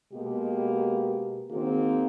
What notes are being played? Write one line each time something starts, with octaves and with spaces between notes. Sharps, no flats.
B2 G#3 A#3 G4
D#3 A#3 C4 D#4 F#4 G#4